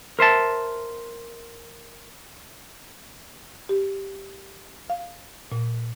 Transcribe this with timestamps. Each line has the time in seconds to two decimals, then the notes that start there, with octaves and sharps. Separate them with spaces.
0.19 A#4 C5 E5 A5
3.69 G4
4.90 F5
5.52 A#2